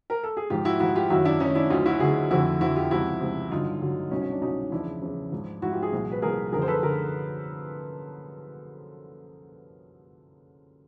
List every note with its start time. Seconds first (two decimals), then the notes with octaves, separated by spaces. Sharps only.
0.10 A#4
0.23 A4
0.37 G#4
0.50 G#2 F3 F4 G4
0.65 E4 F#4
0.80 G#2 F3 E4 F#4
0.95 F4 G4
1.10 F#2 D#3 F#3 E4 F#4
1.25 D4 E4
1.40 F#2 D#3 F#3 C#4 D#4
1.55 D4 E4
1.70 D2 D3 F#3 D#4 F4
1.86 E4 F#4
2.00 D2 D3 F#3 F#4 G#4
2.31 F2 D3 F3 E4 F#4
2.61 F2 D3 F3 E4 F#4
2.76 F4 G4
2.91 C#2 C3 F3 E4 F#4
3.21 C#2 C3 F3
3.51 G2 D3 F#3 D#4 F4
3.81 G2 D3 F#3
4.11 C2 B2 F#3 C#4 D#4
4.21 C#4
4.32 D4
4.42 C2 B2 F#3 C#4 D#4
4.72 E2 C#3 F3 D4 E4
5.02 E2 C#3 F3
5.32 G#2 F3
5.62 G#2 F3 E4 F#4
5.72 F4 G4
5.82 F#4 G#4
5.92 C2 A#2 F3
6.12 B4
6.22 C2 A#2 F3 G#4 A#4
6.52 F#2 D3 F3 G#4 A#4
6.62 C5
6.68 A4 B4
6.83 D3 G#4 A#4